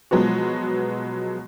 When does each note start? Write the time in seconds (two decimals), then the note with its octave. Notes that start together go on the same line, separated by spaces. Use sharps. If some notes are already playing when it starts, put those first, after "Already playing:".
0.11 B2 F3 F#3 G#3 B3 F#4